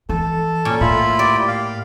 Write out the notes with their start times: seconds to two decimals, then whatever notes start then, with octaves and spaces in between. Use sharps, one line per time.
0.09 E3 A4
0.65 A#2 C#4 C#6
0.81 A2 E4 F4 B5
1.19 G4 D5
1.47 F5